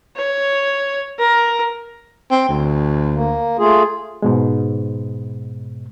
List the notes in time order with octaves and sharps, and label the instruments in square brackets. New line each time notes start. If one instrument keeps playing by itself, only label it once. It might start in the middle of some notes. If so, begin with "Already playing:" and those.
[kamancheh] C#5
A#4
[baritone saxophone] C4
D2
[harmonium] A#3
A3 F4 G#4
[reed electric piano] G#2 B2 G#3